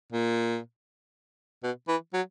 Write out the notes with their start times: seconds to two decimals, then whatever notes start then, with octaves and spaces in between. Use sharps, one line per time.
0.13 A#2
1.63 B2
1.88 E3
2.14 F#3